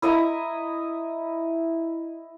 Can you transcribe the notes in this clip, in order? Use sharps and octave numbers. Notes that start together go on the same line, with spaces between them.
E4 D#5 E5 A#5